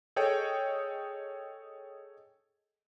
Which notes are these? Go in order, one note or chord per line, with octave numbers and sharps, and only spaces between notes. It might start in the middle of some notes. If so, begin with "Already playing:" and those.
G#4 A4 C#5 D#5 G5